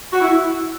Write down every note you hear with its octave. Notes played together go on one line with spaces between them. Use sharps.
F#4
E4